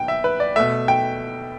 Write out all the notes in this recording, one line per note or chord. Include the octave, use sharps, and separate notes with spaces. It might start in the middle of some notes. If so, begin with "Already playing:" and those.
Already playing: B2 G5
E5
B4
D5
B2 A3 E5
G5